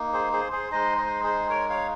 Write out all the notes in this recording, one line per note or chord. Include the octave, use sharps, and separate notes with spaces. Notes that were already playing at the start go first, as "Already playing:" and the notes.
Already playing: A#3 D#4
G#4 C5
G#4 C5
G#4 C5
G#3 D#4 C5 D#5
C5 D#5
G#4 C5
A#4 C#5
C#5 F5